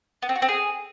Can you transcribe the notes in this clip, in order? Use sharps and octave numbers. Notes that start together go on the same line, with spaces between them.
B3
C4
F#4
C4
G#4